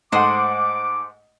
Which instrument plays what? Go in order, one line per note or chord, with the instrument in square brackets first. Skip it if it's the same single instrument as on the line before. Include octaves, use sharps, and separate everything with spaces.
[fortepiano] G#2 A3 F#5 [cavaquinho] C5 C6 D#6 [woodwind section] D6